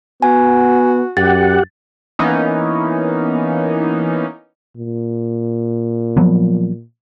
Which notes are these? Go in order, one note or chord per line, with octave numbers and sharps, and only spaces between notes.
B3 F#4 G#5
F#2 G4 F#5 A6
E3 A#3 B3 C#4 D#4
A#2
F3 F#3 B3